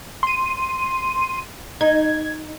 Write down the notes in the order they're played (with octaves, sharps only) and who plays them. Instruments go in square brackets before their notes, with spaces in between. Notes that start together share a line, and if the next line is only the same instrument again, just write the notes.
[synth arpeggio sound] C6 D#7
[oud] D#4 [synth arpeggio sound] G#6